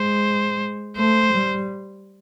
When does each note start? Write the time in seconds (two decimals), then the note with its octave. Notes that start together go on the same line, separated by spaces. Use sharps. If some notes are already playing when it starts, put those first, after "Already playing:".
Already playing: G#3 C5
0.96 A3 C5
1.33 G3